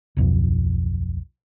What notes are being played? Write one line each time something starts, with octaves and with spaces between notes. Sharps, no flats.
D1 B1 F2